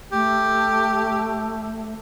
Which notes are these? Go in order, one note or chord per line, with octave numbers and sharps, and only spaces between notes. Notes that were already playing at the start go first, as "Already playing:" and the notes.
A3 G4